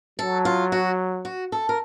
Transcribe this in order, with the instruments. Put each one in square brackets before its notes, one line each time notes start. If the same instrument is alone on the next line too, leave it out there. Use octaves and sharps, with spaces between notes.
[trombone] F#3 [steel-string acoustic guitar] A4
[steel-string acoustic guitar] F4
F#4
F#4
A4
A#4